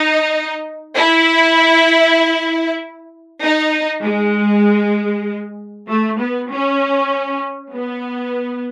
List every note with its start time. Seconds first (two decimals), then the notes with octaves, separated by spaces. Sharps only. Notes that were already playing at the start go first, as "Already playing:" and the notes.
Already playing: D#4
0.95 E4
3.41 D#4
4.03 G#3
5.88 A3
6.19 B3
6.50 C#4
7.73 B3